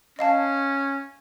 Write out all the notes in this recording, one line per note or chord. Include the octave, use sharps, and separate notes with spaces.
C#4 D#5 F5 A5